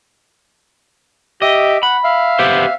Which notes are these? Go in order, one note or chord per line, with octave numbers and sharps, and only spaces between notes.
G4 D#5 E5 D6
F#5 B5
E5 F5
B3 G4 C5